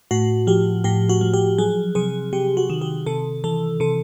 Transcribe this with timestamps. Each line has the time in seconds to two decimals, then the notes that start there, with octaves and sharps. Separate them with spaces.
0.11 A2 F#4
0.47 F3 G4
0.84 A2 G4
1.09 F#4
1.21 F3
1.34 G4
1.58 F#3 G#4
1.95 C3 G#4
2.33 C3 G4
2.57 F#4
2.70 D#3
2.81 G4
3.06 C3 A4
3.44 E3 A4
3.80 C3 A4